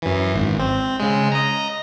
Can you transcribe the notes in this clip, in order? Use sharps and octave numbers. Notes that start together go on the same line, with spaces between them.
F#2 E3
G#1
C4
C#3 G#3
D#5 A#5